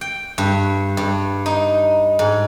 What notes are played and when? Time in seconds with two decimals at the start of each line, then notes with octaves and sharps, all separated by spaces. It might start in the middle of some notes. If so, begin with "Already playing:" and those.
0.01 G5
0.38 G2
0.97 G2
1.46 D#4
2.19 G#2